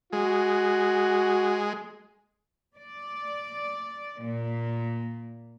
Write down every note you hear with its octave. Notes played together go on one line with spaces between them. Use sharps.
G#3 F#4
D5
A#2